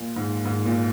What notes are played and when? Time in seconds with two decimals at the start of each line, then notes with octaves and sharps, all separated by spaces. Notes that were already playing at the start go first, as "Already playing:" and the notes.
Already playing: A#2
0.16 G#2
0.45 G#2
0.65 A#2